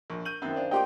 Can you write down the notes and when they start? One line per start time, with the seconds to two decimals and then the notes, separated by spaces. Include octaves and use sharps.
0.10 A#1 A#4 C#6
0.25 G6 D#7 F#7
0.42 F#2 D#3 B3 C4 C5 E5 G5
0.56 D4 C5 D5 F5
0.71 A#3 D#4 G4 G5 C6 D6